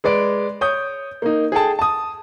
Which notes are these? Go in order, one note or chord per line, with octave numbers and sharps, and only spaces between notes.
G#3 B4 D5 D7
C#5 D#6 G6
A#3 D#4
G#4 A4 G5 A5
A5 D#6